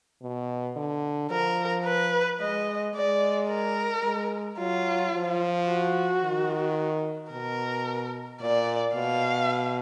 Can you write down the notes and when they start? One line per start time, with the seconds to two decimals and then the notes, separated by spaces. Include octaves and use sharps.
0.22 B2
0.77 D3
1.31 F3 A#4
1.86 B4
2.40 G#3 D#5
2.95 G#3 D5
3.50 A#4
4.04 G#3
4.58 F#3 F4
5.14 F3
5.68 F#4
6.22 D#3
7.31 B2 A#4
8.40 A#2 D5
8.95 B2 F5